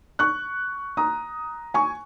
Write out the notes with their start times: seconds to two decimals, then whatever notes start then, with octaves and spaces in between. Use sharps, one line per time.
0.19 C#6 F#6
0.97 A#5 D#6
1.74 G#5 C#6